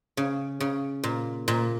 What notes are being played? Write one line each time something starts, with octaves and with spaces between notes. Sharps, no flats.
C#3
C#3
A#2
A#2